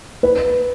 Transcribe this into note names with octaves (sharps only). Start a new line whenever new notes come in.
B4